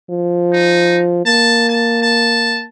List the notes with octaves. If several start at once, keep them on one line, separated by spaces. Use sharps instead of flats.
F3
D#4
A#3 A5
A5
A5